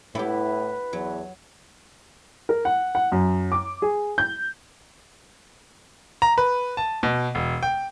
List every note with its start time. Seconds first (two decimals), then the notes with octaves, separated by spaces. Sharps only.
0.15 A2 B3 E4 G4 B4
0.93 E2 F#3
2.49 A#4
2.65 F#5
2.95 F#5
3.12 F#2
3.52 D6
3.82 G#4
4.18 G6
6.22 A#5
6.38 B4
6.77 A5
7.03 B2
7.35 E1
7.63 G5